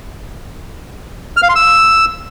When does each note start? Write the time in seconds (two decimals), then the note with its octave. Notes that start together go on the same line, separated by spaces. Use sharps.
1.37 F6
1.43 F5
1.49 C6
1.55 E6